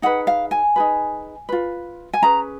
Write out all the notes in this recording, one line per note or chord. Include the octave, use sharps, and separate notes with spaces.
D#4 G#4 B4 F#5
F5
G#5
D#4 G#4 B4
F4 B4
G#5
C#4 G#4 B4 A#5